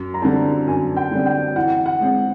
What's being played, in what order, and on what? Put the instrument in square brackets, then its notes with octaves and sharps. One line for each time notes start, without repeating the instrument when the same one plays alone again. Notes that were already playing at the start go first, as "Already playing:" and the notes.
Already playing: [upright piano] F#2
[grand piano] A#5
[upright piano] D3 G3 C4 [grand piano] A5
[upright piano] F#2 [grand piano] G#5
[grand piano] G5
[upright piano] D3 G3 C4
[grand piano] G5
[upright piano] E3 [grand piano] F#5
[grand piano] F#5
[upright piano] G#3 C4